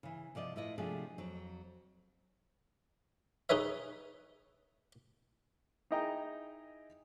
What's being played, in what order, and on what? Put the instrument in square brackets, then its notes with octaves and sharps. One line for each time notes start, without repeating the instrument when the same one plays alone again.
[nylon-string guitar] C#3 E3
C3 F3 D5 D#5
A2 E4 F4 B4 D#5
C3 F3 A3 D4 G4 G#4
F2 F#3
[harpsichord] D#4 G#4 B4 C#5 E5
[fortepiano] D#4 E4 G#4 D#5 G5 A#5